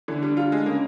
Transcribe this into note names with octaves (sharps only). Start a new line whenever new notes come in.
D3 E3
G3
F4
G#3
C#3 A#3